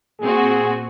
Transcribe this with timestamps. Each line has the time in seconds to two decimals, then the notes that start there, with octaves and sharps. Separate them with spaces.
0.20 A#2 C4 F#4 G#4